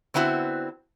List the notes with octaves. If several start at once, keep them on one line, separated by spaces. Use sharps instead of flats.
D3 B3 C4 E4 F#4